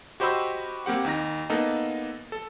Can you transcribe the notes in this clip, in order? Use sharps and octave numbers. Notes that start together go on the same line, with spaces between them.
F#4 G4 C5 D#5 B5 E6
A#3 C4 G4 F#5
D#2 D#4 A#6
A#3 B3 D#4 A4 D#5
A4